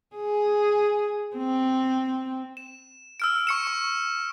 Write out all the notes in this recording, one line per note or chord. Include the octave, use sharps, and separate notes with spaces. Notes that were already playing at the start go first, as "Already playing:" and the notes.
G#4
C4
E7
E6 F6 D7
C#6 C#7 E7
C#6